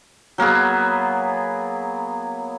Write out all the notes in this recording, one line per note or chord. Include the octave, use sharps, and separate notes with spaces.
F#3 A#3 B3 G#4